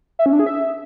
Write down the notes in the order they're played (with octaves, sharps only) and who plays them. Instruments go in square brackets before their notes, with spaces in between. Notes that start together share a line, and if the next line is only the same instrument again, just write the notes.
[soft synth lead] E5
C#4
D4
G#4
E5